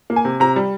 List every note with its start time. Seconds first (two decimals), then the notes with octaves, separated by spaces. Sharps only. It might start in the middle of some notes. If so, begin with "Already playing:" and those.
0.10 A#3
0.16 G#5
0.25 C3
0.40 C3 A#5
0.56 G3